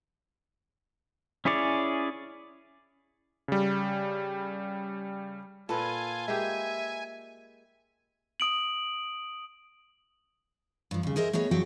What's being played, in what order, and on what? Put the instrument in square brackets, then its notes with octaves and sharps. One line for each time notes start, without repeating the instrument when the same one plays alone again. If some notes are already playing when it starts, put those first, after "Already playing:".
[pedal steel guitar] C#4 E4 G#4 C#5 D5
[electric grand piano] C#3 G3
[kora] A#2 [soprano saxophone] F4 [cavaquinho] A4 B4 [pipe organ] G#5
[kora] G#3 A#3 G4 [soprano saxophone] E5
[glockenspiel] D#6 D7 F#7
[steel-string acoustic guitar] G2 F3
D#2 C#3
G#4 A#4 C5 D#5 E5
A3 B3 G#4 C#5 D#5
D2 G2 F3 F#3 F#4 G5